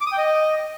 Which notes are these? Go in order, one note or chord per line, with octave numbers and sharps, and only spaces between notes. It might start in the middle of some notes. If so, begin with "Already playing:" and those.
D6
D#6
G5
D#5